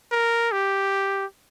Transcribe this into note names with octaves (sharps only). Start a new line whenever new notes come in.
A#4
G4